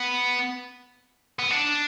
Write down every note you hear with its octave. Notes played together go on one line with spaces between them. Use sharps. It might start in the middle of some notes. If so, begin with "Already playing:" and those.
Already playing: B3
B3
D4